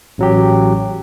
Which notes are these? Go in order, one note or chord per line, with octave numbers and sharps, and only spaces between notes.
A1 F#3 G4